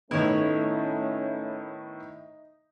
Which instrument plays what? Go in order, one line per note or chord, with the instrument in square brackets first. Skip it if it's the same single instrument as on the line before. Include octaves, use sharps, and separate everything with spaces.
[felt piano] A2 D#3 B3 [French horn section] A3 C#4 [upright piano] D#4 [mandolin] E4 C#5